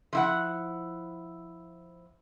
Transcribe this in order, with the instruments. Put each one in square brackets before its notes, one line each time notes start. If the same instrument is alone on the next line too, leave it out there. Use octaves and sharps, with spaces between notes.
[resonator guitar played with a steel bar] F3 E4 F#5